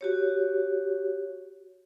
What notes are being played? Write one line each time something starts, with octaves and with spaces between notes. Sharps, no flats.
F#4 G4 C#5